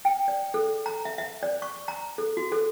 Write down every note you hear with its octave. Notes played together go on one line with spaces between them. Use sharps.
G5
D5
A4
A#5
E5
E5
D5
C#6
A#5
A4
F#4
A4